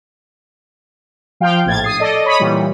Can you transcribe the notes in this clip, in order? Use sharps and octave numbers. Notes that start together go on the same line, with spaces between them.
F3 F5 G5
A#1 A2 G#6 A6
D#6 C7
A4 D5 D#5
C#5 B5 D#6
A#2 E3 G3